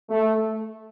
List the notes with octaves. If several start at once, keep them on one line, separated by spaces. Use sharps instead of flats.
A3